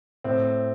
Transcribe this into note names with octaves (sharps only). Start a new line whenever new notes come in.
A2 C4